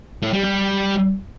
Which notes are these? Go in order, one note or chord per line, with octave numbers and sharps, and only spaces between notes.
A2
G3
G3